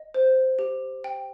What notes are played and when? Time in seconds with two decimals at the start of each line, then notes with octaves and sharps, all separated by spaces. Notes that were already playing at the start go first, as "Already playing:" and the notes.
Already playing: D#5
0.14 C5
0.59 G4
1.04 G5